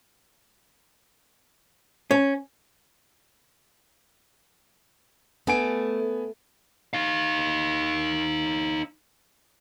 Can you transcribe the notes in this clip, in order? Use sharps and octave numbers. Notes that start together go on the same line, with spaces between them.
C#4
A3 B3 G#5 D7
D#4 F5